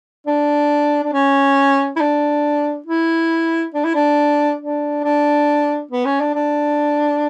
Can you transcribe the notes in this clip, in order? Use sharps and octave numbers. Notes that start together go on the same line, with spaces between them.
D4
D4
C#4
E4
D4
E4
D4
E4
D4
D4
D4
B3
C#4
D4
D4